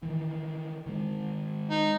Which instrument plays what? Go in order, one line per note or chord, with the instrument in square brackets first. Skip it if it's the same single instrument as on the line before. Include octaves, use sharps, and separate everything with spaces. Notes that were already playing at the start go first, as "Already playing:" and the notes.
[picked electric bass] D#3 E3
D#3 G#3
[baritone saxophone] D#4